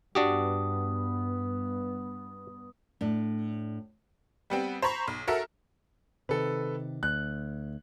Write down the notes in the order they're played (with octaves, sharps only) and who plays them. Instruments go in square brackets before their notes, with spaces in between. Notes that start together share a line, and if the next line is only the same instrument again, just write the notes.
[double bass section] G2 B3 [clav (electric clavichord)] D4 F#4 G4 [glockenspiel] D#6
[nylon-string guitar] A2 D4
[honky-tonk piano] G3 B3 C4
C5 A#5 B5 C#6
B1
F#4 A4 A#4 E5
[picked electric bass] C3 D#3 [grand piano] A4 B4
[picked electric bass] D2 [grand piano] F#6